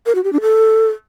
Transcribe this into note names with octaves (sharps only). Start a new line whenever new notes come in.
A#4
F#4
G4
D4
A4